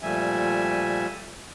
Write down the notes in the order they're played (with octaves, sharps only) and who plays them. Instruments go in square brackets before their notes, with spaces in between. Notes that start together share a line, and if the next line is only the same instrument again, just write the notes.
[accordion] A#2 F3 G3 A3 E5 G#5